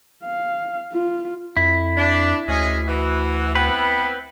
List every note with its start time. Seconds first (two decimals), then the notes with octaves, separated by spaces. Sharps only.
0.24 F5
0.93 F4
1.57 F2 E4
1.97 D4
2.48 D2 G#3 C#4 G#4
2.88 E3 F#4
3.55 B3 C4 E4 B4